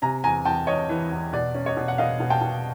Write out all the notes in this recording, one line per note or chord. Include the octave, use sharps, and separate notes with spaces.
C3 G#5 A#5
E2 G#5 A#5
E2 G5 A5
E2 C#5 D#5
E3
E2
B2 D5
C#4
C#5 D#5
B2
F#5
B2 D#5 F5
B2
G5 A5
B2